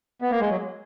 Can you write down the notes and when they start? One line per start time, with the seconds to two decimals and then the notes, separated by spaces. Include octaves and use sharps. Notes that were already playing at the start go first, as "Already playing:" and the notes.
0.22 B3
0.31 A#3
0.40 G#3
0.50 F#3